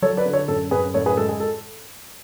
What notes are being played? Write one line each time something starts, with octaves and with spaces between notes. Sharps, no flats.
F#3 A4 C#5
B4 D5
D3
A4 C#5
F#2 A4
F#2 G#4 B4
A2 A4 C#5
G#4 B4
G#3 A4
G#4
A4